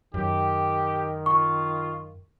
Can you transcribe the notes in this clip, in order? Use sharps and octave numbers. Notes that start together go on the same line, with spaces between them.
F#2 D#3 G4
F4 C#6